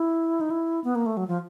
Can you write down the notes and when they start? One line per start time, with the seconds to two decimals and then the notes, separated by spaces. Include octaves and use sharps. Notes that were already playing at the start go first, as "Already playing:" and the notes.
Already playing: E4
0.41 D#4
0.50 E4
0.84 B3
0.95 A#3
1.06 A3
1.17 F#3
1.28 F3